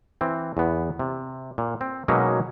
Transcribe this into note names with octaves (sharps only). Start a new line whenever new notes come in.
E3 C4
E2 B3
C3
A#2
C4
B2 F#3 G#3 A#3 C#4 D#4